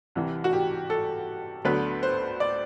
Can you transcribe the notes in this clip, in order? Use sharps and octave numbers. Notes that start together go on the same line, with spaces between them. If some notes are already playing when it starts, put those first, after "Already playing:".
C2 C3 E3
F#4
G4
A4
D2 D3 F#3 B3 B4
C5
D5